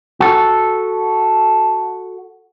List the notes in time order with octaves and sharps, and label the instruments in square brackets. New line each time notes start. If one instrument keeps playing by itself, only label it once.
[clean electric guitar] F#4 A4